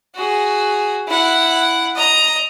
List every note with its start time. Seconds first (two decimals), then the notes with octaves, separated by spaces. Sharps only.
0.15 F#4 G#4
1.08 E4 F#5
1.96 D#5 A#5